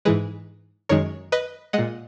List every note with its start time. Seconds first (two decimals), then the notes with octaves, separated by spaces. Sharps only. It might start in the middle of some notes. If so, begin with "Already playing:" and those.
0.05 G#2 E3 G#3 G#4 B4
0.89 F#2 D#3 G#3 A#4 C#5
1.32 B4 D#5
1.73 A#2 G#3 D#5 F#5